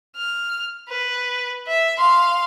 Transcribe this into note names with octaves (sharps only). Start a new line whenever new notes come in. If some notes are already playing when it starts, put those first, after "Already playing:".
F6
B4
E5
F5 C6